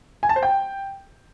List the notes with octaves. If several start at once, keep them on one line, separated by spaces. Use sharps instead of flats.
G#5
A5
C5
G5